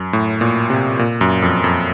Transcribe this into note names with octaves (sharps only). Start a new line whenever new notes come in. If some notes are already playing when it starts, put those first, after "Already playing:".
Already playing: F#2
A2
A#2
C3
A#2
F#2
F2
F2